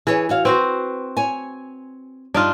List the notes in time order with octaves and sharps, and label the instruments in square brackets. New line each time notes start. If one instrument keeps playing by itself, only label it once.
[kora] E3 [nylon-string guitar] G#4 B4 C#5
[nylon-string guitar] F#4 C#5 F5
[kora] C4 F#4 C5 [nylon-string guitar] B4
[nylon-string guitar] C#5 G#5
[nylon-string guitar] G2 [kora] D4 D#4 F4